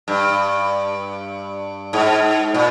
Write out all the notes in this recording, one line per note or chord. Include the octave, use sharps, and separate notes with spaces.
G2
G#2
A#2